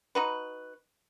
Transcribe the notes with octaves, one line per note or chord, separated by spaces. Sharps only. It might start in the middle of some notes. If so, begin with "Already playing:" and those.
D#4 F#4 B4